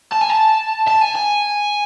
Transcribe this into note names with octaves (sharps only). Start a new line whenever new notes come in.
A5
G#5
A5
A5
G#5
G#5